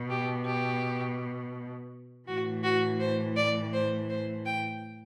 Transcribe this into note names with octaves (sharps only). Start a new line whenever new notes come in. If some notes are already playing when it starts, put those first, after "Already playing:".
Already playing: B2
G4
G4
A2 E3 F#4
F#4
C5
D5
C5
C5
G5